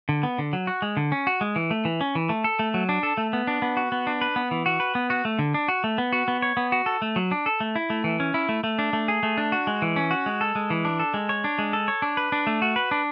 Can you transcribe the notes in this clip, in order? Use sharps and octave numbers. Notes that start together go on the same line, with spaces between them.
D3
B3
D3
F#3
F#4
G#3
D3
C#4
F#4
G#3
E3
A3
E3
C#4
E3
A3
A4
A3
F#3
D4
A4
A3
B3
D4
B3
F#4
B3
D4
B4
B3
E3
F#4
B4
B3
F#4
A3
D3
D4
F#4
A3
B3
F#4
B3
C#5
B3
F#4
A4
A3
F#3
D4
A4
A3
E4
A3
E3
C#4
E4
A3
A3
D4
A3
G#4
A3
D4
F#4
G#3
E3
C#4
F#4
G#3
A4
G#3
E3
D4
A4
G#3
C#5
D4
G#3
A4
C#5
D4
B4
D4
A3
F#4
B4
D4